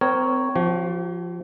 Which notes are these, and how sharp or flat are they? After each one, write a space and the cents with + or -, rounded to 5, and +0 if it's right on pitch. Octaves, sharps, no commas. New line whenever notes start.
C4 -30 A#4 +0 C#5 +0
F3 +0 G4 -45